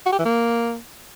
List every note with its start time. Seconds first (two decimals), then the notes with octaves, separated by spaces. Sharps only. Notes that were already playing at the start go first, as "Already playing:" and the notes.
0.06 F#4
0.12 G4
0.19 E3
0.25 A#3